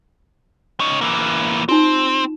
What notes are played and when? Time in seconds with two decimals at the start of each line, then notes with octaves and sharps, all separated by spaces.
0.80 C#4 D#4
1.01 E3 A#3
1.69 C4 D#4 F4